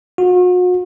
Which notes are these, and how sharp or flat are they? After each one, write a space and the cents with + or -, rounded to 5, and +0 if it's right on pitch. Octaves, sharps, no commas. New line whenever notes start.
F#4 -40